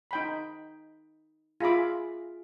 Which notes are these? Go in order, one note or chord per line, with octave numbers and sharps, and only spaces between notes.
D#4 G5 B5
F4 G#4 E5 B5 D6